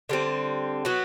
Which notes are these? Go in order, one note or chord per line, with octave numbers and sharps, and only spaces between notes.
D3 G3 C4
F#3 B3 F#4